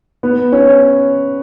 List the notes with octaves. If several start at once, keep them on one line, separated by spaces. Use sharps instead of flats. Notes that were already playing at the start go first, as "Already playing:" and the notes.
B3
C#4